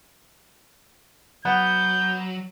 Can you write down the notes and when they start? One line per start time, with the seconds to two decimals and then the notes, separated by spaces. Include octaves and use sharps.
1.45 F#3 B3 G6